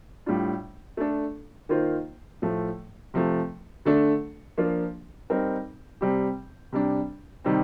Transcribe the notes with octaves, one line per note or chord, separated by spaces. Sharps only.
A2 G3 D4 F4
A3 D4 A4
D#3 A#3 F4 C5
A2 F3 A3
C3 F3 A3
D3 A3 D4 A4
F3 A#3 D4 F4
G3 C4 D#4 A#4
C3 G3 C4 G4
C3 G3 D4
C3 D#3 G3 C4